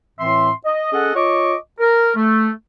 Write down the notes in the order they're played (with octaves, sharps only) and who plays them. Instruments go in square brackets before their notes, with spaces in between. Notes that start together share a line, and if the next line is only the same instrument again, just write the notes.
[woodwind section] A2 E3 C4 E5 C6
D#5
C#4 G#4 A4 D#5 F#5
F4 C#5 D#5 C#6 D6
A#4
A3